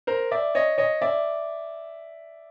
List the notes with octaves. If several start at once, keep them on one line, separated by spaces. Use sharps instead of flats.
A#4 C5
D5 E5
C#5 D#5
C#5 D#5
D5 E5